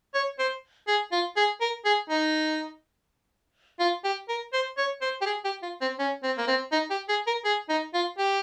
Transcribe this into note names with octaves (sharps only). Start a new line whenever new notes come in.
C#5
C5
G#4
F4
G#4
A#4
G#4
D#4
F4
G4
A#4
C5
C#5
C5
G4
G#4
G4
F4
C4
C#4
C4
A#3
C4
D#4
G4
G#4
A#4
G#4
D#4
F4
G4